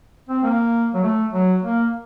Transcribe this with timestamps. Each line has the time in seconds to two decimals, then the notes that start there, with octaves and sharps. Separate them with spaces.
0.29 C4
0.43 A#3
0.94 F#3
1.03 A3
1.33 F#3
1.62 A#3